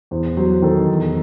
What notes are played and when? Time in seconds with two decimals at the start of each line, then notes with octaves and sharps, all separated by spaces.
0.11 E2 C5
0.37 F#3 C5
0.62 D#3 A4
0.88 E2